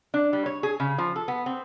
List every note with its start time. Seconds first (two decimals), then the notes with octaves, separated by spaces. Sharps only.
0.14 D4
0.33 G3
0.46 C#5
0.63 G#4
0.80 C#3
0.98 F3
1.16 A4
1.28 B3
1.46 C4